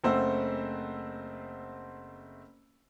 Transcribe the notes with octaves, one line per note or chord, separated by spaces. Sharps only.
F#1 A3 C4 C5 F#5 E6